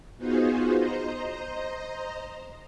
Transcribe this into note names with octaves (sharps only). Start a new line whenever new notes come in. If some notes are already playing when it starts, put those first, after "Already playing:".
B3 D#4 F4 F#4 G#4 C5
C5 D#5 A#5